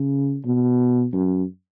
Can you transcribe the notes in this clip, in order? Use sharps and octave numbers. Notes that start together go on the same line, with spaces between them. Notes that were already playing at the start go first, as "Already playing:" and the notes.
Already playing: C#3
B2
F#2